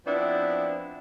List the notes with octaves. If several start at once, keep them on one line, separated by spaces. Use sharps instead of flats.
F3 B3 C4 D4 E4